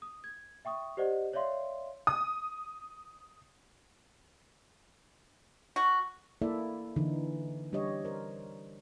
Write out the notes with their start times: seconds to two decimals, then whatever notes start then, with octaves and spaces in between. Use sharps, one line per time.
0.02 D#6
0.24 G#6
0.65 E5 G5 C#6 D#6
0.97 G4 C5 D5 D#5 F#5
1.33 C#5 D5 E5 F5 C6
2.07 D#6
5.76 F#4
6.42 A#3 E4 A4 D5 E5
6.96 D3 E3 D#4
7.73 G3 D4 G4 C#5 D#5
8.05 A#4 C5